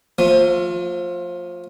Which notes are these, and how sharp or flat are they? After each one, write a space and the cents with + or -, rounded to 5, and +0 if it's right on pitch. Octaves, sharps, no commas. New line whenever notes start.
F3 +20 A3 +45